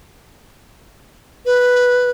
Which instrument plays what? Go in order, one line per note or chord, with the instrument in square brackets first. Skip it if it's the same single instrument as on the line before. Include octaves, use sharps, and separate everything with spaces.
[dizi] B4